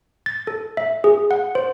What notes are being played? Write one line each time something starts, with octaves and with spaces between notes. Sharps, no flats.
A6
A4
E5
G#4
F#5
C5